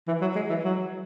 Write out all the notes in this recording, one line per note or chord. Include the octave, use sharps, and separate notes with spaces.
E3
F#3
G#3
E3
F#3